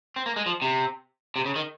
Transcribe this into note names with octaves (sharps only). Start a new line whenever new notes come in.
C4
A#3
G#3
F3
C3
C3
C#3
D#3